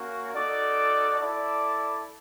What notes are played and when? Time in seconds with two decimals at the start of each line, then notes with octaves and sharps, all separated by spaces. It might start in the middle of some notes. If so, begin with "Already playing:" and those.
Already playing: A#3 C#4 F#4
0.34 D#4 F#4 A4 D5
1.20 E4 A4 D5